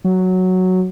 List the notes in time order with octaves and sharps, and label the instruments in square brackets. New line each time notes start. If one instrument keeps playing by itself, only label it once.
[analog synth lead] F#3